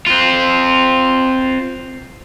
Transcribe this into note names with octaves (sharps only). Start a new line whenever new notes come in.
C4 F4